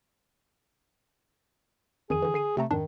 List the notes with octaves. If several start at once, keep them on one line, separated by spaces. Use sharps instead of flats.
F2 D#3 G#4 D#7
D3 E3
D3 C7 D#7
C3 A3 C4 A#5
F2 G#2 D#3 D4